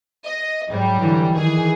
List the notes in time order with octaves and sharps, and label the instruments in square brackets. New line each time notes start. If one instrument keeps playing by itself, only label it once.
[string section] D#5
[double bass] G#2 [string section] F#3 G3
[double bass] D3 E3
[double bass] D#3 E3 [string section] G#4